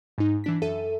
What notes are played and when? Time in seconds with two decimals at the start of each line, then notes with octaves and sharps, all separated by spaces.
0.18 G#2 D#4
0.44 E3 D4 B6
0.62 F#2 A4 E5 D#7